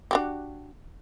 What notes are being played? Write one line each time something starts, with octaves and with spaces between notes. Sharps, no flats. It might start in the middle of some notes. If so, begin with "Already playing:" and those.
D4 F#4 G4